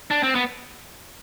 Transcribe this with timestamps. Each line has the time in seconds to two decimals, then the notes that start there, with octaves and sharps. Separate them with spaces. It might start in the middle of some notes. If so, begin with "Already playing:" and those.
0.11 D4
0.23 C4
0.35 B3